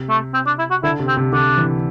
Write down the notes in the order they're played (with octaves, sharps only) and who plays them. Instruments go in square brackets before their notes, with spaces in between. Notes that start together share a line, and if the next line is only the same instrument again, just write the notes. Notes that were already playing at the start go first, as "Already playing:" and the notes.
Already playing: [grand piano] C3
[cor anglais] A3
C4
D4
E4
F#4
[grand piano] D3 [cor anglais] E4
[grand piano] C3
[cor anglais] C4
[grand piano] C3
[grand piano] D3 [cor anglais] D4
[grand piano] E3